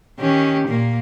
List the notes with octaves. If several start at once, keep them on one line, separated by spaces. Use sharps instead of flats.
D#3 C#4 G4
A#2 A#3